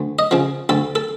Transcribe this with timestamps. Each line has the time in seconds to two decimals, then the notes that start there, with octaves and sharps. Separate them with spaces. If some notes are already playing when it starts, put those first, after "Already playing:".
Already playing: D2
0.19 D#5
0.31 C#3 F3
0.69 D2 A4
0.95 A4